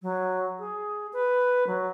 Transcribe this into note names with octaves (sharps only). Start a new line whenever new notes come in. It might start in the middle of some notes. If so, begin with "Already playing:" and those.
F#3
G#4
B4
F#3